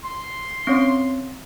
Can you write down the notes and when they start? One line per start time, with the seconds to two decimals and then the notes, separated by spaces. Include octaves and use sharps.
0.04 C6
0.67 C4 C#4 C#5